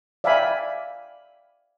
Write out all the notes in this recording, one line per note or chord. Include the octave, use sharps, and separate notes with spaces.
D5 E5 F5 G5 G#5 B5